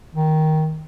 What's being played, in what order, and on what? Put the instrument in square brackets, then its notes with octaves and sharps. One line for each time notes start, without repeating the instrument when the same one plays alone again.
[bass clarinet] D#3